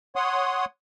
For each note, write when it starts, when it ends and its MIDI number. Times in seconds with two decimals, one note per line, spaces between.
0.16 0.65 73
0.16 0.65 78
0.16 0.65 84
0.16 0.65 87